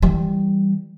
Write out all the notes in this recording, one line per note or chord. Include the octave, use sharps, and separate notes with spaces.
E3 G3